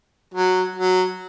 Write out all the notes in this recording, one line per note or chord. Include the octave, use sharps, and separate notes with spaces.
F#3
F#3